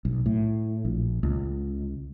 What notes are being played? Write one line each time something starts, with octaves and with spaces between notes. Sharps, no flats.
B1
A2
A#1
C#2